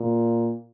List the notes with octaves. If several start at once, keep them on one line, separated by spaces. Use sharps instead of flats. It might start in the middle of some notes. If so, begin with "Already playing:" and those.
Already playing: A#2